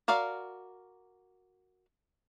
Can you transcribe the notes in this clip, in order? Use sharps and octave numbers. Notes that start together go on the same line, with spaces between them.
F#4 A#4 D5 F5